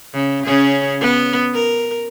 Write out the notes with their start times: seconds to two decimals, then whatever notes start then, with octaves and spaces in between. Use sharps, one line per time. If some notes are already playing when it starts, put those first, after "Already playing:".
0.14 C#3
0.45 C#3 C#4 G#4
1.01 B3
1.54 A#4